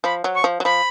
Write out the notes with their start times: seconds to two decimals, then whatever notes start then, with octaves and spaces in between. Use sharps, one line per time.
0.04 F3 B5
0.24 F#3
0.35 C#6
0.44 F3
0.60 F#3
0.64 F3 B5